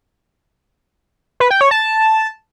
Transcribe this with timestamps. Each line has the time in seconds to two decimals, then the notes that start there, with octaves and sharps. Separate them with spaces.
1.40 B4
1.51 G5
1.61 C#5
1.71 A5